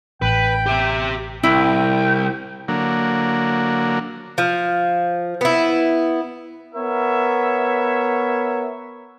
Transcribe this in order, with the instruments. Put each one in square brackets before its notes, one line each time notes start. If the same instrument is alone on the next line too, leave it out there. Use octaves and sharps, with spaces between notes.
[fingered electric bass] A1 [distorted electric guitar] B4 [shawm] G5
[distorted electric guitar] G4 E5
[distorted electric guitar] C2 [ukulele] E4 [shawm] G5
[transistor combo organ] D3 F#3 A#3
[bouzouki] F3
B3 E4
[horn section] B3 A#4 C#5 E5